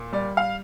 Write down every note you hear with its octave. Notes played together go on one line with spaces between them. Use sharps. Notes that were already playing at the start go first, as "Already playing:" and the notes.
Already playing: A#2
G3 D5
F5